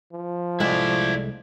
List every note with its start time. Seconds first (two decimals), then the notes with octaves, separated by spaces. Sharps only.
0.13 F3
0.60 C2 G#3 A3 E4 D5